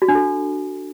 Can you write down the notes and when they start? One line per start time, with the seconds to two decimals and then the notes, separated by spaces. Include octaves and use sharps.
0.02 F#4
0.08 D4
0.15 A4